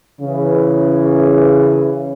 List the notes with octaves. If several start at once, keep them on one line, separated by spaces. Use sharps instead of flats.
C#3 E3